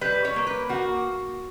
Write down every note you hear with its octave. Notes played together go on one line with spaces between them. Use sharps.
G3 B4
C#5
A#3
B4
A#3 F#4